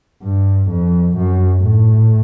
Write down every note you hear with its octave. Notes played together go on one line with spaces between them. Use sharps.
G2
F2
F#2
A2